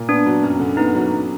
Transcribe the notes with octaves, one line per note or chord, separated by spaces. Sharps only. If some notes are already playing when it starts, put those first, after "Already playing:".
Already playing: A#2
B3 D4
F#3
F#2
D3
B3 D#4
F#3
F#2